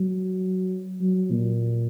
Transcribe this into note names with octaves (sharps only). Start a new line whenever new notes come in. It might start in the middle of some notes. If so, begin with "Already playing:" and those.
Already playing: F#3
F#3
A#2